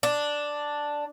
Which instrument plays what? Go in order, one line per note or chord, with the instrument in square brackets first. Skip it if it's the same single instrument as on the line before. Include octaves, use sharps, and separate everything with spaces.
[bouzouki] D4